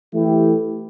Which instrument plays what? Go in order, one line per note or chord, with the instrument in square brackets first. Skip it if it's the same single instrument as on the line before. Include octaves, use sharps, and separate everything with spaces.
[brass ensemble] E3 A3 E4 G4